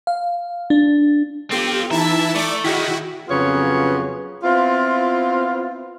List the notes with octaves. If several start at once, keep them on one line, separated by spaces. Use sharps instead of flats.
F5
D4
B3 C4 F4 G4 A4
E3 D#4 E4 E5 A5 A#5
A3 D5 D6
D#3 E4 F#4 G#4 G5 B6
F2 C#3 F#3 B3 F4 C#5
B3 C4 E4 F4